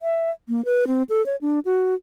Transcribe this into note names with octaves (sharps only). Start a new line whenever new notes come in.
E5
A#3
B4
C4
A4
C#5
D4
F#4